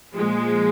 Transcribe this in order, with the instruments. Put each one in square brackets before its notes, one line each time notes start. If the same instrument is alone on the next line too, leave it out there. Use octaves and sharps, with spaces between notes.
[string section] A#2 F3 G#3